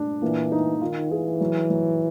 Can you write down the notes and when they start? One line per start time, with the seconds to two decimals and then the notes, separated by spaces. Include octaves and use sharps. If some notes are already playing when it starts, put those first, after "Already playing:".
Already playing: D4
0.21 A#2 E3
0.52 D#4
0.82 D#3 F4
1.11 E3 G#4
1.41 F#3
1.70 F#3